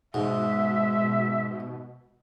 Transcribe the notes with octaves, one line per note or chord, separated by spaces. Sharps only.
G#2 B2 G#3 E5